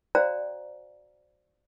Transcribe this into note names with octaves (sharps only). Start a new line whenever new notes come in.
F#4 C5 D5 F5 G5 A#5